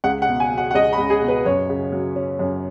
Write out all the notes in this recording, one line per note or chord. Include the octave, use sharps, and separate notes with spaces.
C#2 F#5
F#5
B2
G#5
F#3
F#5
F#5
C#2 D#5
B5
C#2
G#4
B2
B4
F#2 C#5
C#3
F#3
C#4
F#2